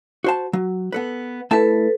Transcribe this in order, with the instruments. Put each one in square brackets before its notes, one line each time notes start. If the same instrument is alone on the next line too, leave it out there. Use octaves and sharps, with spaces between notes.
[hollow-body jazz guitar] F#4 C5 A5
F#3
B3 A4 B4
[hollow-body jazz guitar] A3 E4 A5 [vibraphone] A4 B4